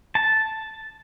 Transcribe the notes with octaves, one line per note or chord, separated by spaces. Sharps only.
A5